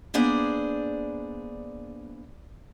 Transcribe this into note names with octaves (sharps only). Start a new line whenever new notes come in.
A#3 B3 D4 G#4 C5 D5